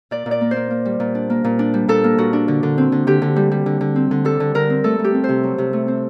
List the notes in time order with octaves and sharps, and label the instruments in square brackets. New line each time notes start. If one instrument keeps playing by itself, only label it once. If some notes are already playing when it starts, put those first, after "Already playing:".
[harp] A#2 D5
A#2
D5
A#3
C5
A#3
A#3
G3
A#2
D4
A#3
A#2
D4
G3
A#2 A4
A#3
A#2 F#4
D4
D3
D3
C4
D3
D3 G4
D3
G3
G3
D3
D3
C4
D3
G3 A4
D3
D3 A#4
C4
A3 A4
A3
G4
C4
C3 C5
F#3
C3
A3
C4